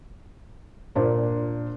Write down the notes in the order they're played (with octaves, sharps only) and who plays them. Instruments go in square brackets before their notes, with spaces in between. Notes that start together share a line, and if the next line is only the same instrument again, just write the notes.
[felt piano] A#2 D4 A#4 C5